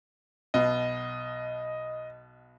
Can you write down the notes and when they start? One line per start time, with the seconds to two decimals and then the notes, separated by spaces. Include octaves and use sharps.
0.54 B1 B2 D#5